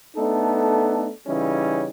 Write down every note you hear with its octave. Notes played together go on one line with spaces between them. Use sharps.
A3 B3 D4 D#4 A4
C#3 E3 G3 C#4 D#4